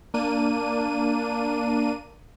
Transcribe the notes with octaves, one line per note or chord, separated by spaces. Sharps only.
A#3 D4 D#7